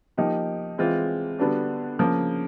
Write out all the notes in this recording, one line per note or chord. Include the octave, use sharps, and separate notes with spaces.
F3 A#3 D#4 G4
E3 G#3 C4 F4
D3 G3 B3 D4 F#4
C#3 F3 A#3